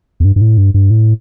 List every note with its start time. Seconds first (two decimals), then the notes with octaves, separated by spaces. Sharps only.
0.20 E2
0.25 G2
0.36 G2
0.41 A2
0.58 G2
0.74 G2
0.91 A2